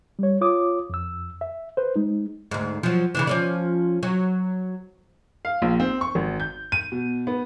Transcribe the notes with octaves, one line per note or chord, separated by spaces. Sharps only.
G3 C#5
F4 C#5 D6 D#6
F2 E6
E5
B4 C5
G#3 D#4
D2 G#2
F3 F#3
C#3 E3 D4
F3 C#4 D5
F#3
F5
A#1
C4
C#6
G#1
G6
D#7
B2
B3